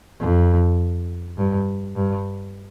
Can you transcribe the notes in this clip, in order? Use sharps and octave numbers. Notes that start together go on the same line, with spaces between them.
F2
G2
G2